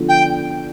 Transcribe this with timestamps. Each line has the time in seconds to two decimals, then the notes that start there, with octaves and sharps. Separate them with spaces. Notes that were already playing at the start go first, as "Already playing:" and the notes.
Already playing: D3 F3 B3 D4 F4
0.09 G5